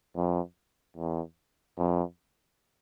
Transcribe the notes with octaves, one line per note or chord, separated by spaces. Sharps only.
F2
E2
F2